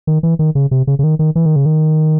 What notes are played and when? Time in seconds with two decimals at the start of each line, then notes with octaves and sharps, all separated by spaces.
0.07 D#3
0.23 E3
0.39 D#3
0.55 C#3
0.71 C3
0.87 C#3
0.99 C#3
1.04 D#3
1.19 D#3
1.35 E3
1.45 D#3
1.56 C#3
1.66 D#3